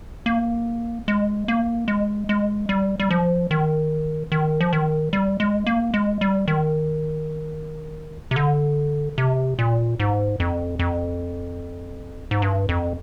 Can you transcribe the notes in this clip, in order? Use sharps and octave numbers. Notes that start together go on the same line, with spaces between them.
A#3
G#3
A#3
G#3
G#3
G3
G3
F3
D#3
D#3
F3
D#3
G3
G#3
A#3
G#3
G3
D#3
C3
D3
C3
A#2
G#2
F2
F2
G#2
G2
F2